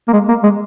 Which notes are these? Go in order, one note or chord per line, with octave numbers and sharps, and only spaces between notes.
A#3
G#3
A#3
G#3